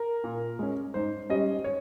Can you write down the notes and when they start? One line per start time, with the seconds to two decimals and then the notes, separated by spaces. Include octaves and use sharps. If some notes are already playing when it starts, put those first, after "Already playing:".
Already playing: A#4
0.24 A#2
0.59 G#3 C#4
0.94 G#2 C5
1.30 G3 C#4 D#5
1.64 C#5